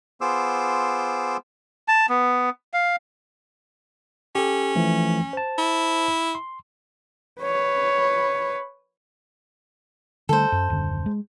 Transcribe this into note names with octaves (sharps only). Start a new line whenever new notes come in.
B3 F4 G#4 C5 D6 E6
A5
B3
F5
C#4 G4 A4
E3 F3 A3
C5 A5
E4
C6
B4 C#5
D3 G3 A3 A4 C5
F#2
D#1 F#2 D3
G#3